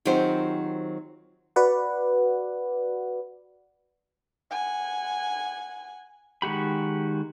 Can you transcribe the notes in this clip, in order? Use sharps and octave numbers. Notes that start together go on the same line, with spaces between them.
D#3 F#3 C4 F4 G4 C5
F#4 B4 D5 F#5
F#5 G#5
D#3 G#3 F#4 G4 B5